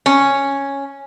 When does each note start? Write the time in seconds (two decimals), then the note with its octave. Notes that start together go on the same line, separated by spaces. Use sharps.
0.06 C#4